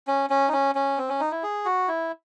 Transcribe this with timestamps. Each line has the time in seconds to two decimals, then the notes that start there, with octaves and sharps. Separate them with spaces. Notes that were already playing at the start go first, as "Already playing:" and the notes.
0.07 C#4
0.30 C#4
0.48 D#4
0.53 C#4
0.75 C#4
0.98 C4
1.09 C#4
1.20 D#4
1.31 E4
1.43 G#4
1.65 F#4
1.88 E4